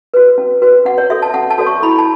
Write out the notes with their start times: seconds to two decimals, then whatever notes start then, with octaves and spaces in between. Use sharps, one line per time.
0.14 F#4 B4
0.38 C#4
0.62 F#4 B4
0.85 C#4 F#5
0.98 C#5
1.10 F#4 A4 C#5 E5
1.22 A5
1.34 C#4 F#5
1.51 A5
1.58 F#4 A4 C#5
1.66 C#6
1.83 E4 B5
1.98 A5